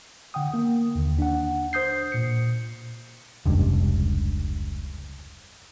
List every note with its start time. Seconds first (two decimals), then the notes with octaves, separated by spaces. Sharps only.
0.34 D3 F#5 G5 D#6
0.54 A#3
0.95 D#2 D3 D#3
1.19 D4 F#5
1.73 C5 D#6 G6 C7
2.12 A#2 C#7
3.46 F1 C#2 G2